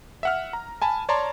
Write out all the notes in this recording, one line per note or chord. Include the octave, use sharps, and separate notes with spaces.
E5 F#5 F6
A#5
G#5 A5 B5
C#5 D5 A5 A#5 C6